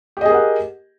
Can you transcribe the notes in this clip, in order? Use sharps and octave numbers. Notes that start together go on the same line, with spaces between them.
G4 G#4 A#4 D#5 F#5